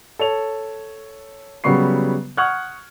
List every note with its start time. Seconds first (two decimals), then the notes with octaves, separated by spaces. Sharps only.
0.19 A4 C#5 F7
1.64 C#3 F#3 G3 B3 C#6 C7
2.37 F#5 C#6 D#6 F6 F#6 G#6